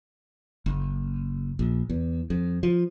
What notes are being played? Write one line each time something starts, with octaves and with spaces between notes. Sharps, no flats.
F#1
A#1
E2
F2
F3